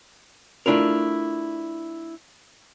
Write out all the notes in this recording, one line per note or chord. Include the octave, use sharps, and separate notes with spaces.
A3 D4 E4 F4 A#4